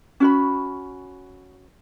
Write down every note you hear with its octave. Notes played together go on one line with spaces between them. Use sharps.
C#4 F#4 B5